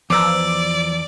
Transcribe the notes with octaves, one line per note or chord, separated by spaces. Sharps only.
E2 F3 B4 D5 A#5 D6 E6